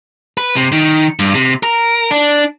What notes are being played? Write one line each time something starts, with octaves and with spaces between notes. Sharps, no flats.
B4
C3
D#3
G2
C3
A#4
D4